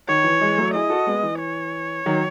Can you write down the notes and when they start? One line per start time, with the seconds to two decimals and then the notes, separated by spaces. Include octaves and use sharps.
0.08 D#3 C#5
0.24 E3
0.40 E3 G#3
0.58 F#3 A3
0.74 E4 G#4 D#5
0.90 F#4 A4
1.07 G#3 B3
1.23 E3
1.40 C#5
2.06 D#3 F#3